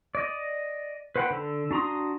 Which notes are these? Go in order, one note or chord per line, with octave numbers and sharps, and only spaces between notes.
D5 D#5
B4 C5 F#5 G5 B5
D3 A4
D4 F#4 A#5 C6 D#6